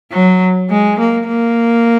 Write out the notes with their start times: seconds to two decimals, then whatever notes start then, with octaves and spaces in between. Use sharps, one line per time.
0.12 F#3
0.70 G#3
1.00 A#3
1.28 A#3